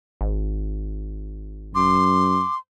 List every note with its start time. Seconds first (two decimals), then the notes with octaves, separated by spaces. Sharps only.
0.21 G#1
1.75 F#2 C6 D6